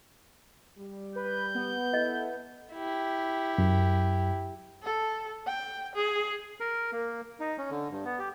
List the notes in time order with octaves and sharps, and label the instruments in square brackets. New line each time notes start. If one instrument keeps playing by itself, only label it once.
[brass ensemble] G3
[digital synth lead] B4 [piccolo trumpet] G6
[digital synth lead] B3
[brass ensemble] E4 A4 [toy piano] D#5
[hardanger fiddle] E4 G4
[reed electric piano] F#2
[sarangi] A4
G5
G#4
[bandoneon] A#4
A#3
D#4
C#4
D3
G2
B3
G4